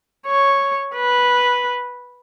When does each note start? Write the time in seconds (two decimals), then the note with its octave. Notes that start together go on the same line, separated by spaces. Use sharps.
0.26 C#5
0.95 B4